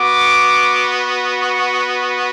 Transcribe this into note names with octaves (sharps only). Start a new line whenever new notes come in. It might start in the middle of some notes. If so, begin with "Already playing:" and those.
Already playing: B3 F#4 D6
C#6